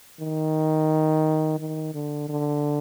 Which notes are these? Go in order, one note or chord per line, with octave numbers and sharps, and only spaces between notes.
D#3
D#3
D3
D3